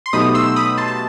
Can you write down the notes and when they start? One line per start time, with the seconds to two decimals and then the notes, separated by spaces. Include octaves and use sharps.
0.06 C6
0.13 B2 F#3 A3 D#4 G4 B5 D#6
0.34 C6 E6
0.56 B5 D#6
0.78 A5 C6
0.88 A5